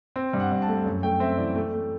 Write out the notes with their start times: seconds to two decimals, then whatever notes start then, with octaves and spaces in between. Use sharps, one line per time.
0.16 C4
0.33 G2
0.40 F#5
0.51 G2
0.62 A5
0.68 A3
0.86 F#2
1.03 A3 G5
1.20 C4 E5
1.38 E3 D5
1.55 A3
1.73 A3